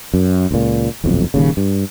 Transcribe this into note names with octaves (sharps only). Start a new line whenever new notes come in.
F#2
C#2 A#2
D#1 B1 F2
D#1 D#2 C#3
G2